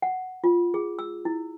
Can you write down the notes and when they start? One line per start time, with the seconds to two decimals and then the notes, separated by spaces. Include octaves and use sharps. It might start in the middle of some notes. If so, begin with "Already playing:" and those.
0.02 F#5
0.44 F4
0.74 G#4
0.99 E6
1.25 E4